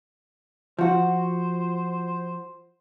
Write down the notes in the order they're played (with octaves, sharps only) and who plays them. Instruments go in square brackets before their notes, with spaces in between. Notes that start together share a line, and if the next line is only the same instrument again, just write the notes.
[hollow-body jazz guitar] F3 F#4 [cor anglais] C5